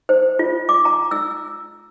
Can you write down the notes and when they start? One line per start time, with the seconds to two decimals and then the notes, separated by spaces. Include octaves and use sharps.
0.09 C5
0.39 F4
0.69 D6
0.85 A#5
1.11 E6